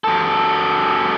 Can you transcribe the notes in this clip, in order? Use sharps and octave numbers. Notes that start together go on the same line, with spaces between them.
F#2 A4